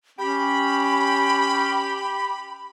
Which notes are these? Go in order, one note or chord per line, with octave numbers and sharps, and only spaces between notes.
C#4 G4 B5